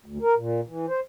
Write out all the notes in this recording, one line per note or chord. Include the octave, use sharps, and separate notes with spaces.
D2
A#4
A#2
E3
C5